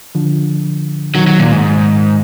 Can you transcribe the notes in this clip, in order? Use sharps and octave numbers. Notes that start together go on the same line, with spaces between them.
D3 F3
B2 D#3 F#3
F#3
A#2
G#2